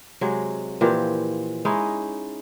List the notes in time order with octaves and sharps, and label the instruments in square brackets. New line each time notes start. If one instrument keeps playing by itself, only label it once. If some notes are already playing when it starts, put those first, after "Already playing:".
[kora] C3 F#3 G#3
A#2 E3 F3 G4
G#3 C#4 D#4 E4